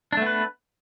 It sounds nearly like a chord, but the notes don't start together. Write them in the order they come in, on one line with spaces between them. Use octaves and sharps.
D4 A3 B3 B4